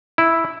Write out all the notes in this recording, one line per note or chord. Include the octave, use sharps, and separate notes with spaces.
E4